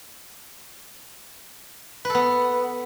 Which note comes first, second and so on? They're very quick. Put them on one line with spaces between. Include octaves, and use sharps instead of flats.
B4 A4 B3